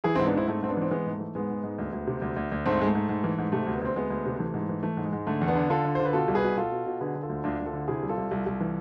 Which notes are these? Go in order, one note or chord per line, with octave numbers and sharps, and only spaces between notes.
E3 E4 G#4
G#2 C4 E4
B3 D4
G#2 C4 E4
G#2 A3 C4
G#2 C4
B3 D4
E3 C4
E3 G#3 B3
G#2
A3
E3
G#2 G#3 B3
G#2
G#2
D2
D2
C3
D2
D2
D2
G#2 A3 C4
G#2 G#3
A3
G#2
G#2
E3
G#2
C3 A3
D2
B3
D2 C4
D2 G#3 B3
D2
C3
E3 A3
G#2
E3
E3 A3
G#2
G#3
G#2
D3 A3
E2
B3 D4
D3
D3 F4 A4
D3
C5
D3
B4
B2 F4 A4
C2
G#4 B4
B2
B2 F4 A4
B2
B2
D3 G#4 B4
D3
F4 A4
D2
D2 D4 F4
D2
F4 A4
D3
C3 E4 G#4
C2
F4 A4
C2
C2
C2
E3